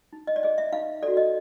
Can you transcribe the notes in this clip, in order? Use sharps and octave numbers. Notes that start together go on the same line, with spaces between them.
D#4
D#5
D5
G#4 C5 D#5
E5
D#4 F5
F#4 A4 D5
D#5